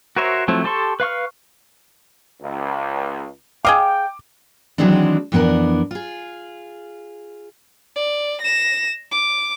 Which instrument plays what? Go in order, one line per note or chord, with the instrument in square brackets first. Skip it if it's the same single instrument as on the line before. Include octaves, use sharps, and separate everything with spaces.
[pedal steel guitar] F#4 A#4 C5 C#5 E5
F3 F#3 A3 C4 E4
G4 A4 A5 C6 C#6
B4 F5 C#6 F6
[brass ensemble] C#2
[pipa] G#4 D#5 F5 [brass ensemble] G5 [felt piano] D6
[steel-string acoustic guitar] D#3 E3 F#3 G#3 C4 D4
F2 E3 B3 D4 A#4
F4 G#4
[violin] D5
A#6 E7
D6